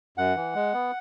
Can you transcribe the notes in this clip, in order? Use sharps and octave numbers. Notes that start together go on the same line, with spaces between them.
F#2 F#5
E3
G#3
B3